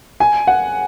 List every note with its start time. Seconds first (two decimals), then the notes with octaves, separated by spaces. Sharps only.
0.20 G#5
0.47 F#5